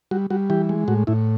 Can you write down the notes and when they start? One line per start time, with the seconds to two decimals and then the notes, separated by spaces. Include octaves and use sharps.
0.11 G3 F#4
0.30 G3 F#4
0.50 E3 G4
0.69 G#3
0.88 A2 F#4
1.07 A2 E4